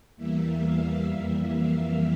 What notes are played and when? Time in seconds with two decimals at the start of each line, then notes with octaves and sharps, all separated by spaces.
0.16 E2 E3 G3 A#3 E5
0.60 F5
1.05 F2 E3 G3 A#3 E5
1.49 F5